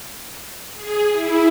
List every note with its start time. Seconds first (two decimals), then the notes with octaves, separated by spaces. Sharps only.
0.75 G#4
1.12 E4